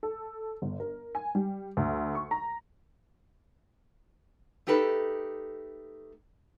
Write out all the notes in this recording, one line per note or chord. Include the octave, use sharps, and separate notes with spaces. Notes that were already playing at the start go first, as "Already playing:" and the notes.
A4
G1
A#4
G#5
G3
D2
C#6
A#5
A3 D#4 G4 A4 B4